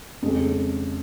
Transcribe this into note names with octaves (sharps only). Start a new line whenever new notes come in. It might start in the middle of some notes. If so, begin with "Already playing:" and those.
F2 C#3 G#3